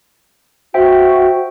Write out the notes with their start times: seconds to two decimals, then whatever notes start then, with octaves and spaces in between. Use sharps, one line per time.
0.74 F#4 C5 E5 G5